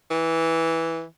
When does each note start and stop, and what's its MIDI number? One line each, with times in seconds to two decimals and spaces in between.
0.11 1.03 52